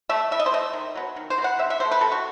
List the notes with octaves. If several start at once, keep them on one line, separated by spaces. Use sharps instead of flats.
A3 E5
E3 E5
D#5
C5
A3 D#5
D#3
F#3 B3
D#3
C5
F#3
B3 F#5
C3 E5
E5
F#3 A3 C5
B4
C3 A4
F#4